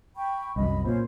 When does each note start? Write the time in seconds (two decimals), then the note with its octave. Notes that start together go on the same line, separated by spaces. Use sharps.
0.16 G5 B5 C#6
0.56 C2 F#2 D#5 B5
0.85 A#2 C#4 C5